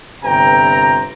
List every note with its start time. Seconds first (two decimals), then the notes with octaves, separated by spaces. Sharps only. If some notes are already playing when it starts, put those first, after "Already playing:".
0.24 G1 C3 B4 G5 A#5